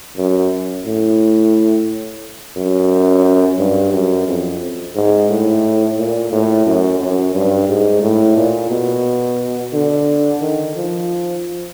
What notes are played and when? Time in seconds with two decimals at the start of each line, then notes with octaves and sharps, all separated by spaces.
0.17 F#2
0.86 A2
2.57 F#2
3.59 G2
3.93 F#2
4.28 F2
4.95 G#2
5.30 A2
5.98 A#2
6.32 A2
6.66 F#2
7.00 F#2
7.35 G2
7.69 G#2
8.02 A2
8.37 A#2
8.70 B2
9.74 D3
10.42 D#3
10.76 F3